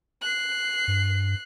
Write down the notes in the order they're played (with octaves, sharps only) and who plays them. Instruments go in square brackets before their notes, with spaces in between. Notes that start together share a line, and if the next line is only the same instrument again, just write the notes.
[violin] F#6 C7
[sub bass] G2